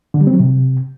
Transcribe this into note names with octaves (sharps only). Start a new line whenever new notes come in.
D3
G3
C4
F#3
C3